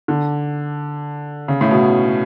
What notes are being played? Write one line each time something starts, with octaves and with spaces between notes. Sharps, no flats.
D3
C#3
A2
B2